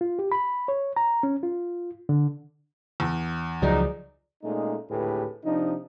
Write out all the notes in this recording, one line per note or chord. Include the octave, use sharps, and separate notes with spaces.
F4
G4
B5
C#5
A#5
C#4
F4
D3
E2
C#2 F3 F#3 D#4 G#4 D5
A#2 G#3 A3 C#4 D#4
G#1 D2 A2 G4 G#4 B4
C3 F3 D4 D#4